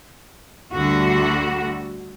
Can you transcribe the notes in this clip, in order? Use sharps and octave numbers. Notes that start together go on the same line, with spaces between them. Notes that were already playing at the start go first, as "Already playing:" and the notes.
D2 D3 G3 F#4